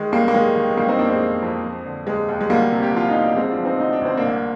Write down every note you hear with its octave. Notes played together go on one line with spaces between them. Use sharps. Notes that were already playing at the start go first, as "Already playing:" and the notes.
Already playing: D#3 G#3
D#2 G3 A#3
A#3
D#3 G#3
D#3
G#3
D#3 G3 A#3
C4 D#4
F2 A#3 D4
G#3 C4
F2
F2
F3
D3
D#2 G#3
D#2
G#3
D2 G3 A#3
C3
G4
F3 F4
D#4
D2
D4
D2 G#3 C4
D4 F4
F3
C4 D#4
D2 D#4
D4
D2 C4
A#3 D4
C2